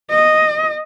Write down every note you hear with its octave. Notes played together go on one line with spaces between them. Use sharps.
D#5